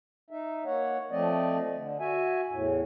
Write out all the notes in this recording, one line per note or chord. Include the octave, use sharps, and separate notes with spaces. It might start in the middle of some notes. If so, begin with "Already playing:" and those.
D#4 E5
A#3 C#5 F#5
F3 A3 C4 D5 D#5
D3
F#4 E5 G#5
E2 A2